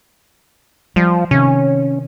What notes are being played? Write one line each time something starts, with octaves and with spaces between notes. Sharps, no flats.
F3 G3
C3 D#3 C#4